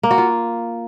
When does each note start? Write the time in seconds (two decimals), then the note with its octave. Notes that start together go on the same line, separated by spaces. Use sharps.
0.03 A#3
0.11 F#4
0.18 F4